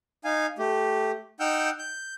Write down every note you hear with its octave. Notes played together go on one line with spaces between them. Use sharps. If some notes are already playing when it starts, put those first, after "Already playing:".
D#4 F5 G#5
A3 G4
D#4 F#5 G5 E6 F6 G6
G6